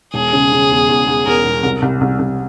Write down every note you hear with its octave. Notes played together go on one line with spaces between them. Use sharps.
E1 G#4
C#3
C#3
E2
E2
E2
E2 A#4
E1
C2
C2
C2
C2